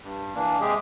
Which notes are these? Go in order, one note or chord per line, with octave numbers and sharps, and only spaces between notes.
G2
E3 A#3 D4
C3 G#3 G4 G#4